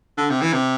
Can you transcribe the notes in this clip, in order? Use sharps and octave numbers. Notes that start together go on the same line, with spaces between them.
D3
C3
E3
C3